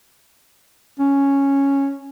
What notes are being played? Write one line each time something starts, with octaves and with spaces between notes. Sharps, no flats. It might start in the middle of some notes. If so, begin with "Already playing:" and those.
C#4